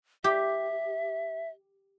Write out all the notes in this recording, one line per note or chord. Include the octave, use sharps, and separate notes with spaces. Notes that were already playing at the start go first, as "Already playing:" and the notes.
G4 E5